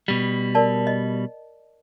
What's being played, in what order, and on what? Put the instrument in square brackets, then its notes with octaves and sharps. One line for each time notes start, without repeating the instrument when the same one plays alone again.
[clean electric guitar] B2 G3
[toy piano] A#4 D5 A5
D#5